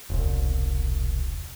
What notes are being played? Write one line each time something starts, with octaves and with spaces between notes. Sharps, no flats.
E1 C2